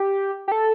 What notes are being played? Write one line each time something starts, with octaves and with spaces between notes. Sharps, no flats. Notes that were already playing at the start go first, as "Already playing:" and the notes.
Already playing: G4
G4
A4